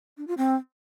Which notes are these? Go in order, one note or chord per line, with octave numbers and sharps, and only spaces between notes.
D4
F4
C4